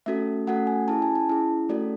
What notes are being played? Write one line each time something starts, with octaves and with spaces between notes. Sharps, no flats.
A3 C#4 F#4 A4 E5
A3 C#4 F#4 A4 F#5
G#5
C#4 E4 G#4 A5
G#5
A5
C#4 E4 G#4
A3 C#4 F#4 A4 D5